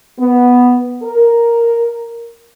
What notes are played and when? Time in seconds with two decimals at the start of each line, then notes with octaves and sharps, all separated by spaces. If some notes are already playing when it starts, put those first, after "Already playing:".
0.19 B3
1.03 A#4